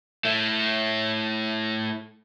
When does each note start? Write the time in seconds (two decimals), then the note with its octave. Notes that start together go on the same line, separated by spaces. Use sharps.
0.25 A3 E4